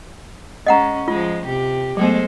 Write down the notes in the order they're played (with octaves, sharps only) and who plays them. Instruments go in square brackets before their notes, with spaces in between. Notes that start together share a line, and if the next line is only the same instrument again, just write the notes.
[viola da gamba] G#3 C#4 [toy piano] D#5 F#5 A#5
[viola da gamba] F3 G#3 [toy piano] F4
[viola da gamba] C3 G4
[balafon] F#3 A3 B3 [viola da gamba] G#3 A4 C5